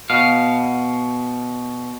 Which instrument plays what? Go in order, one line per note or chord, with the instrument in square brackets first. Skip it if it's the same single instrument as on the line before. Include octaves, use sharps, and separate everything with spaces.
[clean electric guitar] B2 F5